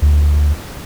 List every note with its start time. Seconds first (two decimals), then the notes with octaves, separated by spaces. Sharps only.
0.02 D2